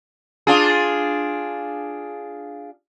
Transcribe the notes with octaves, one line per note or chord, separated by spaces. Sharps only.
D4 F4 G#4